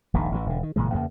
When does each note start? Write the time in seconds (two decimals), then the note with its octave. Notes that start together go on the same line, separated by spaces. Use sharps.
0.14 D#1 A#1 G#2 D#3
0.32 A1 A2 D3 E3
0.46 E1 D3
0.63 D#3
0.76 F#1 A#2 E3 G#3
0.92 E2 C#3 A#3